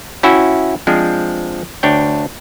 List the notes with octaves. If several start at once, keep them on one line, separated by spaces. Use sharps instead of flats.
C#4 E4 F#4 E5 G5
F3 G#3 C4 D4
D2 D4 C#5 G5